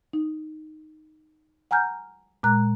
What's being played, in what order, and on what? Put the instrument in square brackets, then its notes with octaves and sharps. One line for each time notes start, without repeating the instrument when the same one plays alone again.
[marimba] D#4
F#5 G#5 A#5 F6 G6
A#2 G#3 A#5 F#6